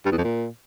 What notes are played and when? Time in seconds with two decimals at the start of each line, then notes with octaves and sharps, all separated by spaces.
0.05 G2
0.12 E2
0.18 F2
0.24 A#2